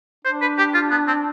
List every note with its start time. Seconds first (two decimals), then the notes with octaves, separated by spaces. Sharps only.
0.25 D4 C5
0.41 B4
0.58 G4
0.74 F4
0.91 B3
1.08 C4